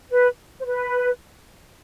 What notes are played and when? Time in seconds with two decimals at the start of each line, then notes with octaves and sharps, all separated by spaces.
0.10 B4
0.60 C5
0.66 B4